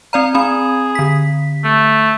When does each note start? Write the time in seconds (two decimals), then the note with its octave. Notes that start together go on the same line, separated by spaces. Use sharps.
0.13 C4 D5 F5 A#5
0.34 C4 G#4 B5
0.95 D3 B6
1.65 A3